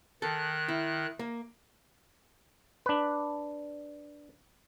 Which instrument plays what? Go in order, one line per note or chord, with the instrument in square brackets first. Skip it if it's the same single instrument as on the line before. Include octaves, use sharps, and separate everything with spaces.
[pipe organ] D#3 F#6 [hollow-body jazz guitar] A4
[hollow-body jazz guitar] E4
A#3
[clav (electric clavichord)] D4 B4